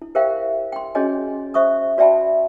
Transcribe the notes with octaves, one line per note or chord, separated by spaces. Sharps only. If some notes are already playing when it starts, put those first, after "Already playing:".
E4
G4 A#4 C5 E5 F5 G5
G5 C6
C#4 F#4 G#4 C#5 D#5 G#5
C5 E5 C#6 D#6
F#4 D5 E5 G5 A5 B5